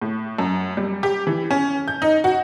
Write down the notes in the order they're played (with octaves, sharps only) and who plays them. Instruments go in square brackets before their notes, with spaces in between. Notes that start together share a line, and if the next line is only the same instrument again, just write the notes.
[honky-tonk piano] A2
F#2
G3
G4
E3
C#4
G6
D#4
F#4